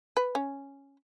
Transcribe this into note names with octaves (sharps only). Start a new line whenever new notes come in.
B4
C#4